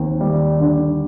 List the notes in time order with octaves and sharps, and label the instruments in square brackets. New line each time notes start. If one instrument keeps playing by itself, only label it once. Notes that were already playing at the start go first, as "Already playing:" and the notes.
Already playing: [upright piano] D#2 C4 [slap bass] A#3
[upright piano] G3
D3